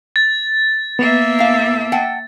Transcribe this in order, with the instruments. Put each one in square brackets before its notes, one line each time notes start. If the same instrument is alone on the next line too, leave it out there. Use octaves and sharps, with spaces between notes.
[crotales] A6
[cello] A#3 E5 [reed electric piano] B3
[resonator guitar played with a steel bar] A2 F5
F#5 G5 A5